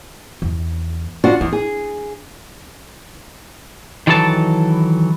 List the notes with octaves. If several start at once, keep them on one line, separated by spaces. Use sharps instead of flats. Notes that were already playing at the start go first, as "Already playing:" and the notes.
E2
D4 F4 F#4
E2 D4
G#4
D#3 E3 F#3 A4 C#5 A5